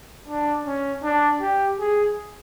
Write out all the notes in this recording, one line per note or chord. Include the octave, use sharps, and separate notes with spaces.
D4
C#4
D4
G4
G#4